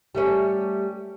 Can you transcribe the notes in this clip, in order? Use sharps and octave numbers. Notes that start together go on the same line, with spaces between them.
G3 A3 C#4